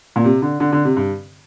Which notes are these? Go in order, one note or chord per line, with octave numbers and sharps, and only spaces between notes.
A#2
C3
D3
D3
D3
C3
G2